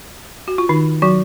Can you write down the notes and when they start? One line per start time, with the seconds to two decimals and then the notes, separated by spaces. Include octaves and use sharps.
0.48 F#4
0.58 F4
0.69 D#3 D#4
1.02 F#3 F#4